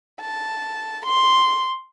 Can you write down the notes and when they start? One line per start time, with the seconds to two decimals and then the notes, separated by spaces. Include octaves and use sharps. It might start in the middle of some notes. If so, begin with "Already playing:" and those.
0.21 A5
1.06 C6